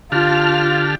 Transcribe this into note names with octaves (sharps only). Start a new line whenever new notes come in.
D3 F4 G4 A5 F6